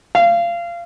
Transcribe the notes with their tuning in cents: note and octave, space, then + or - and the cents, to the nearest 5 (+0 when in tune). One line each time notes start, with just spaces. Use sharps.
F5 -25